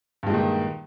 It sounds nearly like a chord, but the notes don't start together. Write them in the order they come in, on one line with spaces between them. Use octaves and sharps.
G2 G#3 A#2 D#3